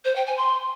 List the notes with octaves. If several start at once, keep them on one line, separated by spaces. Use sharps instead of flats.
C5
G5
G#5
C6